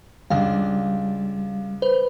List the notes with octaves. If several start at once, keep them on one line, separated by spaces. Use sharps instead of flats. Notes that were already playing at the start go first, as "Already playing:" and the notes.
C#2 G3 D4 F5
B4 C5